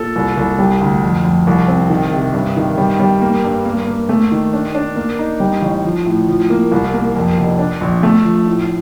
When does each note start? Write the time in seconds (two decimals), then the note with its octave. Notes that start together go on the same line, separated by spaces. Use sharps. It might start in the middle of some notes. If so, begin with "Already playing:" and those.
Already playing: A#2 A4
0.16 C2
0.38 C2
0.58 G3
0.81 D2
1.03 F2
1.25 F2
1.47 C2
1.68 C4
1.90 D#3
2.13 C3
2.34 G2
2.56 D#3
2.78 G3
3.00 G3
3.21 A#3
3.44 G2
3.65 A#3
3.87 A#3
4.09 A3
4.32 D#3
4.53 D4
4.75 D4
4.96 A#3
5.19 D#4
5.40 G3
5.62 A1
5.85 F3
6.06 A2
6.28 F3
6.50 A#3
6.72 C2
6.93 A#3
7.16 F2
7.38 F1
7.59 D4
7.81 A#1
8.03 A3
8.25 F3
8.47 A2